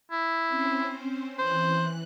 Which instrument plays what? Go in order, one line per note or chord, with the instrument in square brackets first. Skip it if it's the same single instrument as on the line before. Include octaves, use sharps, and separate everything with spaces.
[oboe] E4
[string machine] C4 C#4 C5
[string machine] E3 F#6 [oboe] C5